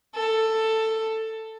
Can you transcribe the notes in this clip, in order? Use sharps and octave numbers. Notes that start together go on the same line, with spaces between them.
A4